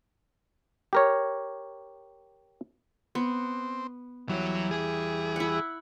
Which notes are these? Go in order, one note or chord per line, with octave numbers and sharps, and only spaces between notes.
G4 A#4 C#5
B3 C4
E2 E3 F#3 G3 C#5
G#4
E4 F#5